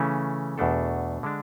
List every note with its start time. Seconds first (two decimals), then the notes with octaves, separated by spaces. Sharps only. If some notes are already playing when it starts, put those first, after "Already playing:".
Already playing: C#3 E3 A3 C#4
0.58 E2 B2 A3 D4 A4
1.23 D3 G#3 D4